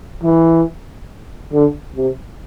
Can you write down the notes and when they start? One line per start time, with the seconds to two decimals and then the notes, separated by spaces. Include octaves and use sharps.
0.23 E3
1.52 D3
1.96 C3